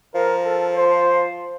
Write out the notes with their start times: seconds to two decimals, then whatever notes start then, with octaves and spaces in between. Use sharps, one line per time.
0.15 F3 A#4
0.44 A4
0.76 C5